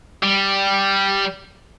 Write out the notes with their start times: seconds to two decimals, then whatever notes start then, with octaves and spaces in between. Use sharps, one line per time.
0.23 G3